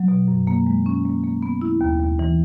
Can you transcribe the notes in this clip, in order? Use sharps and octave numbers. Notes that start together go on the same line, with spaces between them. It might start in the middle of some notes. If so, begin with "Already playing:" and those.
Already playing: F#3
B2
F#2
A#3
G#3
C#4
A#3
A#3
B3
E4
D#2
D#2
E3